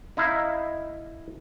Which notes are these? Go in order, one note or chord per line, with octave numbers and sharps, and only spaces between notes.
D#4 E4 F5